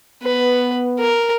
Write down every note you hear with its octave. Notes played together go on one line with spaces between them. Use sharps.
B3 B4
A#4